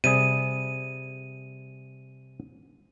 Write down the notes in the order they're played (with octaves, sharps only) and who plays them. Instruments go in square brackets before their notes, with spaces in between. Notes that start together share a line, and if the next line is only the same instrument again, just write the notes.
[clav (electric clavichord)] C3 G3 G#4 [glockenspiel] D#7